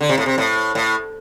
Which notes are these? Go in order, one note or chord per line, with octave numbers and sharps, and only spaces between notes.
D3
C3
A2
C3
A2
A2